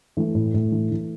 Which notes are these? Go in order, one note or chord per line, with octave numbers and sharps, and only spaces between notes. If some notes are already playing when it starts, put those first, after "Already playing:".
E3 A3
A2
A2
E3
E3